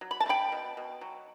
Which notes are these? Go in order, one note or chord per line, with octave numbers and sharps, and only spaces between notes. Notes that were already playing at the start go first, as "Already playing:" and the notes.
F#3
B5
A5
A3
G5 B5
B2
B2
F#3